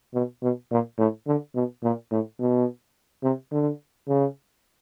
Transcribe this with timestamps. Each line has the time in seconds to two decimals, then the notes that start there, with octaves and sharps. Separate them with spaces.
0.14 B2
0.42 B2
0.71 A#2
0.98 A2
1.27 D3
1.55 B2
1.83 A#2
2.11 A2
2.39 B2
3.23 C3
3.52 D3
4.08 C#3